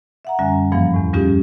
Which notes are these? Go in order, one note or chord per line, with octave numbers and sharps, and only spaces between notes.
E5 F#5 A#5
F#2 D3 G3 C#4 E5 G#5
G2 A#2 E3 F3 A#3 F5
E2 A2
G3 C#4 D#4 F4 G4 G#4